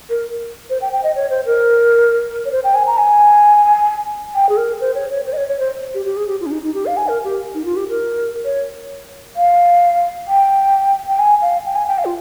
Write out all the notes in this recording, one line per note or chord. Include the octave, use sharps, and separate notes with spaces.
A#4
C5
G5
G5
D#5
C#5
C5
A#4
C#5
C5
G5
G#5
A#5
G#5
G5
G#4
A#4
C5
C#5
C#5
C5
D#5
C#5
C#5
C5
G4
G4
G#4
G4
F4
C#4
D#4
D#4
G4
F5
G#5
A#4
G4
D#4
F4
G4
A#4
C#5
F5
G5
G5
G#5
F5
G5
G#5
G5
F5
F4